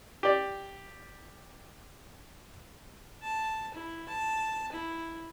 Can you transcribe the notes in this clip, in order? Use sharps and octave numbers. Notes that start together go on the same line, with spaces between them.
G4 D5
A5
E4
A5
E4